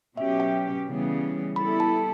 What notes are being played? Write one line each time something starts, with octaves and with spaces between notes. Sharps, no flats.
B2 F#3 C#4 G4 E5
G5
C#3 E3 G3 B3
G3 B3 E4 A4 B5
A5